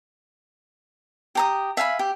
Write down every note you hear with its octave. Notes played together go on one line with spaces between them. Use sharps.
G4 A#5 D#6
E5 F5 G#5 B5
G4